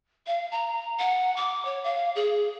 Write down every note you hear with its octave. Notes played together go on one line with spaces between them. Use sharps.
F5
A#5
F#5
D6
C#5
F5
G#4